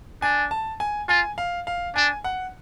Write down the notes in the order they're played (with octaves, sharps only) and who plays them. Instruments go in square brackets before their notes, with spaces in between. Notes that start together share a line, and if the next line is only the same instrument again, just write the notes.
[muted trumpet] D4 [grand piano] G#5
[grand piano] A5
G#5
[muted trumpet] F4 [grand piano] G#5
[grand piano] F5
F5
[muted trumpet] D4 [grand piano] G#5
[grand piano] F#5